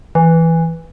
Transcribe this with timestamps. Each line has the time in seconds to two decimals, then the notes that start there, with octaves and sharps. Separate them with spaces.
0.15 E3